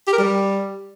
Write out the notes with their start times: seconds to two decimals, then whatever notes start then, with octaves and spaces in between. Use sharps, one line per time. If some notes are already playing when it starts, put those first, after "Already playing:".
0.07 G4
0.13 A#4
0.18 G3